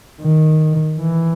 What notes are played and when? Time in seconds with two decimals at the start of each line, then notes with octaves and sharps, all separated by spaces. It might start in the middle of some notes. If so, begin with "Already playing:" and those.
0.21 D#3
0.99 E3